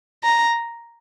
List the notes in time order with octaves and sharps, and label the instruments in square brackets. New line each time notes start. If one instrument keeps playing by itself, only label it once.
[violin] A#5